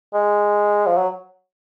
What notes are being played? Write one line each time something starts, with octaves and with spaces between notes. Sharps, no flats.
G#3
F3
F#3